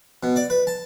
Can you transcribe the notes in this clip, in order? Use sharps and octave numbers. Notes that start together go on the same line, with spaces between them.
B2
D5
B4
A5